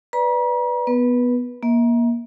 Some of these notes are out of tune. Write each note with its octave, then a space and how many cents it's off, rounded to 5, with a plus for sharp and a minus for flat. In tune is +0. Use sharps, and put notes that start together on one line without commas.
B4 +0 D5 -5 A#5 +40
B3 +0 B4 -20
A#3 +25 E5 -30